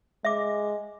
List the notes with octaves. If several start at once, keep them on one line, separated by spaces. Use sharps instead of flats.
G#3 E5 D6